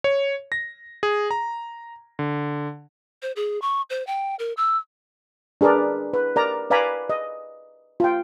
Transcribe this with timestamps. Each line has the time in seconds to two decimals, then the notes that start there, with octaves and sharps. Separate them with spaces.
0.04 C#5
0.52 A#6
1.03 G#4
1.31 A#5
2.19 D3
3.22 C5
3.36 G#4
3.62 C#6
3.90 C5
4.07 G5
4.39 A#4
4.57 E6
5.61 D4 G#4 A#4 B4 D5
6.14 B4
6.36 A#4 D5 A#5
6.70 B4 D5 F5 G#5 A#5 B5
7.10 D#5
8.00 F4 G5